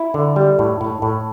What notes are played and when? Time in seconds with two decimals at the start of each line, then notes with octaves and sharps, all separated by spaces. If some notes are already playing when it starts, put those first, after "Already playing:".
Already playing: E4
0.14 D3
0.36 G3
0.59 A2
0.81 A2
1.02 A2